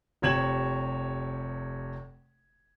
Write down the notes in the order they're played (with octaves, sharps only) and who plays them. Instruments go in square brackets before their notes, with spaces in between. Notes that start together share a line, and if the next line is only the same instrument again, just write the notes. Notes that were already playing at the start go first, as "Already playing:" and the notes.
[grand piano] F1 C3 C#5 G#6 E7 F#7